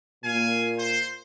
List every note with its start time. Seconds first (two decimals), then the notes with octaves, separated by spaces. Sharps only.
0.24 A#2 F5 G#5
0.78 C5